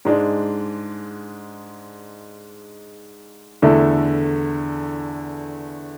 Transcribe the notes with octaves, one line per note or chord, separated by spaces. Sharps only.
G#2 G#3 D4
E2 D3 A3 E4